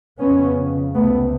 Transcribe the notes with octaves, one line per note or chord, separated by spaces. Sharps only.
F2 C#3 B3 C#4
C#2 C3 A3 B3